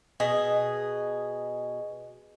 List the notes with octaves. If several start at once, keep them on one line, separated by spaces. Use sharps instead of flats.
B2 G#4